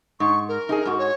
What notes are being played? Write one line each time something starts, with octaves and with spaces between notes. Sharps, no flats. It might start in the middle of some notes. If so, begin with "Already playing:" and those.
G#2 C#6
A#4
D#4 G4 G#4
G#2 F#4
C#5